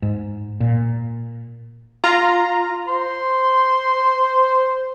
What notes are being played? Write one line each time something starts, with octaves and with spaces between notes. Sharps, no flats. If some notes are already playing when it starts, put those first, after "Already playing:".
G#2
A#2
F4 A#5
C5 C6